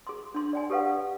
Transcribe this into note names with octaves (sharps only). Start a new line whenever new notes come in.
G#4 C6
D4 C6
D5 G5 G#5
G4 A4 B4 F5 F#5